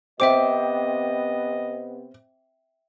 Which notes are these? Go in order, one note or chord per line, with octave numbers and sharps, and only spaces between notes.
C3 B3 C4 C5 D#5 E5 G5 D6